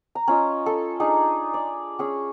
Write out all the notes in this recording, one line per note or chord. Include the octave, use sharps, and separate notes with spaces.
A#5
C#4 F4 D#5
A4
D4 D#4 G#4 D5
D5
C#4 G#4